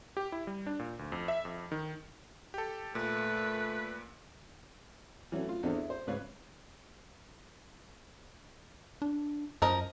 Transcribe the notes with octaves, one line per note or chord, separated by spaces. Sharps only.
G4
E4
G3
D4
A#2
D2
F2
E5
F2
D#3
G4 A4
A#2 A3 B4
E3 F#3 A3 C#4
F4
E2 B3 C4 D4 A4 D#5
E4
C5
C#2 G#2 B4 C#5 F5
D4
F#2 F3 A#4 D#5